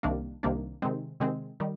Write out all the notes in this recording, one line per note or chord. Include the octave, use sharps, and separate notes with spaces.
C2 C3 D#3 A#3 D4
C2 C3 D#3 A#3 D4
C3 D#3 G#3 C4
C3 D#3 G#3 C4
D#3 G3